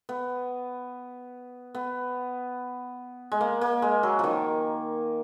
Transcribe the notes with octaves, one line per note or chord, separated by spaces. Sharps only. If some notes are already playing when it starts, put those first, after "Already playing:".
B3
B3
G#3
A#3
A#3
G#3
F#3
D#3 F3